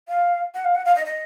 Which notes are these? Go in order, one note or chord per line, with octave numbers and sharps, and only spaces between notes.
F5
F#5
F5
F#5
F5
D#5
D#5